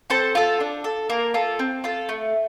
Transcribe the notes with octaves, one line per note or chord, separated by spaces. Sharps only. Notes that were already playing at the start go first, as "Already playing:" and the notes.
C4 A4 C5
F4 A4
D4
A4
A#3 A#4
F4 A4
C4
F4 A4
A3